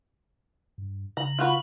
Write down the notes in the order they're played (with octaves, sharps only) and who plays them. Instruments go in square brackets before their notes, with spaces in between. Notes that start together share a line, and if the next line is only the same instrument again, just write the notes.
[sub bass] G2
[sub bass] C#3 [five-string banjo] A#5 [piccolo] F#7
[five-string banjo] F4 F#4 B4